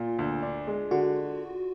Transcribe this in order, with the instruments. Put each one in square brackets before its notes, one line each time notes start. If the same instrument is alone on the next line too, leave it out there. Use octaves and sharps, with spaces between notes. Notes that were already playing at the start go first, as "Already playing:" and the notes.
Already playing: [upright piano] A#2 [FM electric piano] F4
[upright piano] D2
D4
G#3
[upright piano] D3 [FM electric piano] F#4